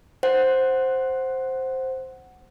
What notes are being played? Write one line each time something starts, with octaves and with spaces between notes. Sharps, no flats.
C5 F#5